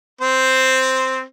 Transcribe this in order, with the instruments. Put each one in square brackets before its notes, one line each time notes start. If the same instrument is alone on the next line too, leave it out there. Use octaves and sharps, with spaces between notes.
[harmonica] C4 C5